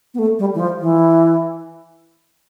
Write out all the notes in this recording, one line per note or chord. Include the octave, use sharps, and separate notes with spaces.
B3
A3
G3
E3
F3
E3